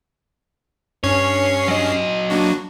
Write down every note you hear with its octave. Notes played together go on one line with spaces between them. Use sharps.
G2 C#4 C#5 C7
F#3 D#5
A#3 D4 F#4